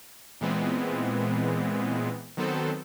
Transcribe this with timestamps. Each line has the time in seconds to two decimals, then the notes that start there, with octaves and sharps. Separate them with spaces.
0.41 A#2 E3 G#3 B3 C4
2.37 D#3 F#3 B3 C4 A4 C5